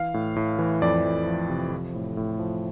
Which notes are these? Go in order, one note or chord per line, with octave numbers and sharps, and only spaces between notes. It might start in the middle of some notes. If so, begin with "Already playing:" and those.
Already playing: E3 F5
A2
A2
E3
F2 D5
F2
F3
C3
F3
A2
A2
F3